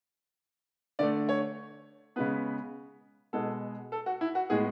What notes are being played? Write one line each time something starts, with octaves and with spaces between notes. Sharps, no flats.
D3 A3 D5
C#5
C#3 G#3 B3 B4
B2 G#3 B3 A4
A4
F#4
E4
F#4
A2 G#3 B3 G#4